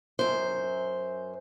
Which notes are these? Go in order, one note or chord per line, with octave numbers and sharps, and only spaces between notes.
F#2 C5